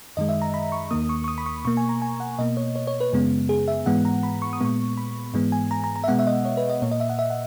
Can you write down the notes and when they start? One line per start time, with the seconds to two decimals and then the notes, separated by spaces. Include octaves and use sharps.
0.17 F#2 D#3 G#3 D#5
0.29 E5
0.42 A#5
0.54 B5
0.72 C#6
0.91 D#2 D#3 A#3 D#6
1.09 C#6
1.24 C#6
1.28 D#6
1.38 B5
1.46 C#6
1.65 B2 A#3 C#6
1.77 G#5
1.89 A#5
2.02 G#5
2.20 F#5
2.39 B2 A#3 D#5
2.57 C#5
2.76 C#5
2.87 C#5
3.00 B4
3.13 F#2 C#3 G#3 B3
3.49 G#4
3.68 E5
3.86 G#2 E3 G#3 B3 F#5
4.05 A#5
4.23 B5
4.42 C#6
4.53 D#6
4.61 A#2 G#3 B3 C#6
4.97 B5
5.34 G#2 E3 G#3 B3
5.52 G#5
5.71 A#5
5.84 A#5
5.96 A#5
6.04 E5
6.08 B2 G#3 B3 F#5
6.19 E5
6.27 D#5
6.45 C#5
6.57 B4
6.70 D#5
6.82 A#2 A#3 C#5
6.91 D#5
7.00 E5
7.10 F#5
7.19 E5
7.30 F#5